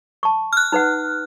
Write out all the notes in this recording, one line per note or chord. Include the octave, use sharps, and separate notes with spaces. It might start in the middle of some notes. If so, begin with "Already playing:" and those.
A5 C#6
F6 F#6
D#4 B4 F#5